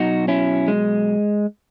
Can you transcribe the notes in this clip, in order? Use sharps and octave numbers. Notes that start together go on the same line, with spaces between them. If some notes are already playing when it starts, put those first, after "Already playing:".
Already playing: B2 F#3 D#4 F#4
C#4 E4
G#3